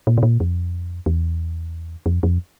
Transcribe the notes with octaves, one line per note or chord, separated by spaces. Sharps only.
A#2
B2
A#2
F2
E2
F2
F2